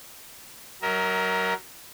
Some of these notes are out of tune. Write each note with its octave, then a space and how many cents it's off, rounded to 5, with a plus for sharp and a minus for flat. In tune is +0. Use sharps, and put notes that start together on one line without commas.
F#3 +25 A#4 +0 E5 -45